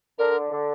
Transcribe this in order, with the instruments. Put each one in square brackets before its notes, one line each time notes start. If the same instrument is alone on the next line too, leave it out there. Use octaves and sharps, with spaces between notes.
[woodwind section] D3 [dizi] A#4
[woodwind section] D3